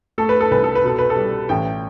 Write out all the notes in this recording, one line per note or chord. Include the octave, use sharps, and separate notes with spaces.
A3 A4
B4
A4
C2 B4
A4
B4
B2 A4
B4
A4
G3
A1 G5